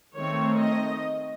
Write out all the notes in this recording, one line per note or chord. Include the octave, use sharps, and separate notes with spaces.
D#3 A3 C4 C#5
D#5